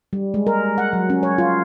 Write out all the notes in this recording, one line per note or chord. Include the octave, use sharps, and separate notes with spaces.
G3
G#3
A#4
F#5
F#3
C#4
C#5
F4